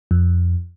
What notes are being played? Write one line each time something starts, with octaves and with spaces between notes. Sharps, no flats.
F2